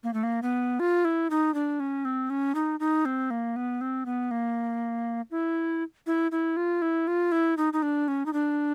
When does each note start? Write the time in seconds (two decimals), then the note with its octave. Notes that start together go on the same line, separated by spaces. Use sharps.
0.04 A#3
0.14 A3
0.23 A#3
0.42 B3
0.80 F4
1.05 E4
1.30 D#4
1.54 D4
1.80 C#4
2.05 C4
2.30 C#4
2.55 D#4
2.80 D#4
3.05 C4
3.30 A#3
3.56 B3
3.81 C4
4.06 B3
4.31 A#3
5.31 E4
6.07 E4
6.32 E4
6.57 F4
6.82 E4
7.07 F4
7.32 E4
7.57 D#4
7.73 D#4
7.82 D4
8.08 C#4
8.26 D#4
8.33 D4